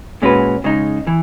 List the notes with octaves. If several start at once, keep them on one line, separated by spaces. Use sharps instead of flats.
A#2 G#3 C#4 F#4 B4
C#3 G#3 D#4
E3